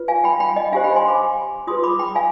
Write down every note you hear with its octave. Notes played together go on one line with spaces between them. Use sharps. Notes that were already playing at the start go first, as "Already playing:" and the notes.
Already playing: F4 B4
F5 G#5
G5 B5
G5 B5
D#5 G5
D4 G4 C5 F5 G#5
G5 B5
G#5 C6
B5 D6
F4 G#4 B4 C6 D#6
B5 D6
G5 B5
F5 G#5